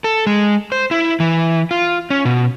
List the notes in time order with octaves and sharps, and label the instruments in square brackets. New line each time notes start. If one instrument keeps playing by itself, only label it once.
[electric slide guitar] A4
G#3
C5
E4
E3
F4
C#4
B2